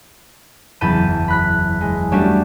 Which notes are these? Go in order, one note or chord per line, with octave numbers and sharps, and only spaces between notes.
F#1 E2 A5 B5 G6 D#7
B5 F#6 B6
G#3
G3 A3 C#4 D4 F#4 G4